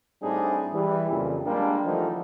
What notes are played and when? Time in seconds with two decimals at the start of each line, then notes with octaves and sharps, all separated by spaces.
0.22 A2 G3 C4 D4 D#4 G#4
0.74 E3 G3
1.10 F2 A#2 C#3
1.46 G3 G#3 A#3 D4
1.85 D3 E3 F3 A3 A#3 D#4